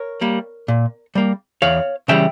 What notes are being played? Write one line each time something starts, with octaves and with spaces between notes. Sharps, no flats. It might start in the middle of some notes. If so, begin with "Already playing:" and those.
Already playing: A#4 C#5
G3 A#3
A#2
G3 A#3
E2 C#5 F5
C#3 E3 G3 E5 G5